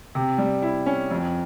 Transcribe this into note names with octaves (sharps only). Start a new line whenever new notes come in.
C3
G3
E4
C#4
F2